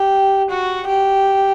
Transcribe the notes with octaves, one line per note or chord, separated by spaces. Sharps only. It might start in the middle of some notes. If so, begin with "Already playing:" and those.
Already playing: G4
F#4
G4